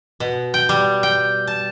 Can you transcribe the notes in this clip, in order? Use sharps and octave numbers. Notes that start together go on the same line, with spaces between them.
B2
G5
G3
G5
A5